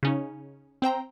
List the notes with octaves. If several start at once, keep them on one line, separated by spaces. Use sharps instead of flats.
C#3 C#4 D#4
C4 C5 G5 A#5